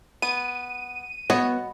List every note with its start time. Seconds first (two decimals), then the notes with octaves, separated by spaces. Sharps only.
0.22 B3 D#7
1.30 B3 F#4 C#5 D#5